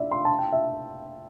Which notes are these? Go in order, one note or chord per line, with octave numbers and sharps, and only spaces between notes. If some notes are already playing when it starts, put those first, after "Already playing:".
Already playing: D5 E5
C6
A5
G5
E5